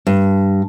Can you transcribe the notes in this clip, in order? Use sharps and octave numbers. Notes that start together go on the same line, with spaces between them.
G2